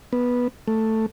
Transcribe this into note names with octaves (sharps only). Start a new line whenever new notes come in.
B3
A3